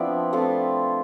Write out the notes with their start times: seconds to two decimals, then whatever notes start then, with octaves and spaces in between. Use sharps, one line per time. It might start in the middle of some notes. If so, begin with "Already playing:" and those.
Already playing: F3 B3 C4 D4 E4 C5 D5 E5
0.33 A3 C4 F4